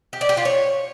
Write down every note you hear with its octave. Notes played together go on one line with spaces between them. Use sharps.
G4
D5
G4
F4
C#5